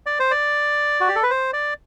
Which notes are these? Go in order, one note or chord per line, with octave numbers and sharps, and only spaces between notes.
D5
C5
D5
F#4
G4
A4
B4
C5
D5